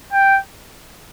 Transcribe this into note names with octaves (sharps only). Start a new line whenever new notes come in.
G5